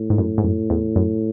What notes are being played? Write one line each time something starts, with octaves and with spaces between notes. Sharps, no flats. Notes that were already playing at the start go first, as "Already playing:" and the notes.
Already playing: A2
G#2
F#2
G#2
F#2
E2
F#2